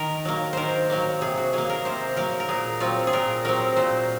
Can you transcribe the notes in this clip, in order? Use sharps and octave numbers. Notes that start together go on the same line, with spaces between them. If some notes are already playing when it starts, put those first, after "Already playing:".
Already playing: D#3 A#4
F#3 A#3
D#3 A#4 C5
F#3 A#3
C3 G#4
F#4
F#3 A#3 G#4
A#4
C3 C5
F#3 A#3 A#4
A#4
A#2 G#4
F#3 C4 F4
G#4
A#2 A#4
F#3 C4 A#4
A#2 C5